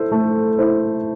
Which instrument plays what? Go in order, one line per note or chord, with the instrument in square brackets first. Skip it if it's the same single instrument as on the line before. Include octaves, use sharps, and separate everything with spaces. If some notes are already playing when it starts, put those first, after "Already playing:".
Already playing: [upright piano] E4 C5 [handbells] A4
[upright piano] A3
E4 C5